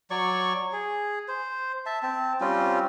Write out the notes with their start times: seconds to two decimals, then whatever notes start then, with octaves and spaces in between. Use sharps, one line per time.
0.11 F#3 C#5 D5 C#6
0.73 G#4
1.28 C5
1.86 E5 A5
2.03 C4 A5
2.41 G3 C4 C#4 F4